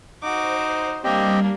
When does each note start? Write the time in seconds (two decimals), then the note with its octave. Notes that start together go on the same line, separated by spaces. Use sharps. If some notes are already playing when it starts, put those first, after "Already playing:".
0.23 D#4 F#4 C5 D6
1.04 G3 A#3 C4 D4 G4 D#5